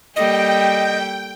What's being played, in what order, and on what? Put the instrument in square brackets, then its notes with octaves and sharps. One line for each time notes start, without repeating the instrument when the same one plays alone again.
[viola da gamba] G3 A#3 A4 [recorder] D#5 [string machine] G5